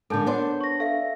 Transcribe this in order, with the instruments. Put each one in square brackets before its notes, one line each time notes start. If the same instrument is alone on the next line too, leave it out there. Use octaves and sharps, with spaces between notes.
[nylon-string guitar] G#2 D3 [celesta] A4 A5 [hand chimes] A#4 D6 G6
[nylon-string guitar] B3 D4 C5 [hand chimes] C#5
[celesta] C#6 A#6
[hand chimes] A4 E5 A#6 [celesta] F5